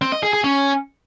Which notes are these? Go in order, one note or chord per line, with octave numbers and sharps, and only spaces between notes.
C4
D#5
G#4
G#4
C#4